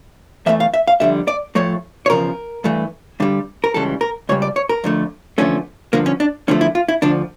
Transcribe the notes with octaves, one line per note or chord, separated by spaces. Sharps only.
E2 E3 A3 E5
F5
E5
F5
F2 D3 G3 E5
D5
A2 F3 A3 C#5
C#5
E2 C#3 F3 A#4
G2 E3 A3
G2 D3 G3
A#4
C#2 C#3 E3 G3 A4
A#4
C#2 C#3 G3 C#5
D5
C#5
A#4
F2 D3 A3
E2 D3 F3 A3 C#4
G2 D3 F3 A#3
C#4
D4
E2 D3 F3 A3 C#4
E4
F4
E4
D2 D3 F3 D4